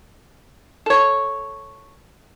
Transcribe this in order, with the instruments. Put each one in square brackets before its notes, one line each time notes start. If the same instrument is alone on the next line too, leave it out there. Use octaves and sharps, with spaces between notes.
[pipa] A4 C#5